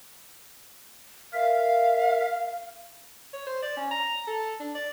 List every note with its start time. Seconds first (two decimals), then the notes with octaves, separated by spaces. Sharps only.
1.33 A#4 E5 F5
3.33 C#5
3.47 C5
3.62 D5
3.77 C#4
3.91 A#5
4.27 A4
4.60 D4
4.75 D5